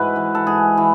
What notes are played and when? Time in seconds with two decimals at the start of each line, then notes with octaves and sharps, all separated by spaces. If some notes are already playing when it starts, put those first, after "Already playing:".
Already playing: G#2 E4 F#4 B4
0.16 E3
0.35 A4
0.46 G#2 G#4
0.77 E3